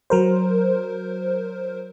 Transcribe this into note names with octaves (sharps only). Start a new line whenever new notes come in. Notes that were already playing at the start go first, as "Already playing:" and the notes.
F#3 A#4 C5